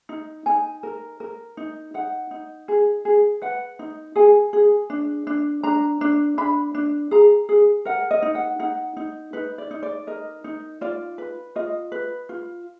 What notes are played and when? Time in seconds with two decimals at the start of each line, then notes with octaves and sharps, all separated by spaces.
0.09 D#4
0.46 D#4 G#5
0.83 A#4
1.20 A#4
1.57 D#4
1.94 D#4 F#5
2.31 D#4
2.68 G#4
3.05 G#4
3.42 B4 F#5
3.79 D#4
4.16 G#4 G#5
4.53 G#4
4.90 D4
5.27 D4
5.63 D4 A#5
6.01 D4
6.38 D4 B5
6.75 D4
7.11 G#4 A#5
7.49 G#4
7.85 A#4 F#5
8.11 D#5
8.22 D#4
8.35 F#5
8.60 D#4 F#5
8.97 D#4
9.33 D#4 B4
9.58 D5
9.71 D#4
9.83 D5
10.07 A#4 D#5
10.44 D#4
10.81 F4 D5
11.18 B4
11.56 F4 D#5
11.92 B4
12.29 F4